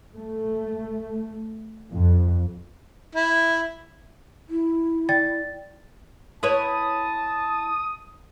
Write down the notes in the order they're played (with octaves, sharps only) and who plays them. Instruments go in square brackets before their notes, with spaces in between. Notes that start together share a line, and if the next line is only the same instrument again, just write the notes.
[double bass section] A3
F2
[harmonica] E4
[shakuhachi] E4
[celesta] D5 G5 A6
[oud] E4 B4 C#5 [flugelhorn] A5 [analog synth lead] D#6